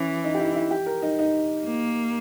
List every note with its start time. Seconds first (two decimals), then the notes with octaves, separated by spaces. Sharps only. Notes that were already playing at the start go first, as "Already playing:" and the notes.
Already playing: E3 C#4
0.24 D#4
0.34 G4
0.39 E4
0.55 E4
0.71 G4
0.86 A#4
1.02 D#4
1.19 D#4
1.65 A#3